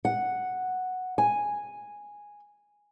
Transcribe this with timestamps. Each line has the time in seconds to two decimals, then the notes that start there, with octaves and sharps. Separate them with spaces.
0.05 F#5
1.18 G#5